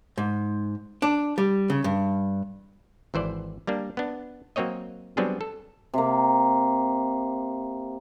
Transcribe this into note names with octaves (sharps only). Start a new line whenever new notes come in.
G#2
D4
G3
C#3
G2
G#1 E3 C5 D5
G3 A#3 D4
B3 D4
F#3 A#3 C4 C#5 D#5
F#3 G3 B3 C4 D4 G#4
A4
C3 A#3